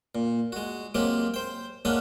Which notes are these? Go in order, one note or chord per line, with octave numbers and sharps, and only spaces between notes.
A#2
G#3 F#4
F#3 G#3 A#3 C4 G4
C5 G5
G#3 A#3 C#4 D4 D#5 F#5